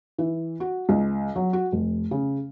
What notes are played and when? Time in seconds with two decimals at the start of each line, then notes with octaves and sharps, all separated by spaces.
0.18 E3
0.60 F#4
0.89 C#2
1.36 F#3
1.53 F#4
1.72 F1
2.11 C#3